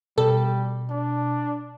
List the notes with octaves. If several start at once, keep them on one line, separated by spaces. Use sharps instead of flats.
B2 G3 A4
D4